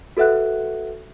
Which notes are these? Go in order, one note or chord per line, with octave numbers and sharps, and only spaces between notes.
F#4 A4 B4 E5 F#5 F#6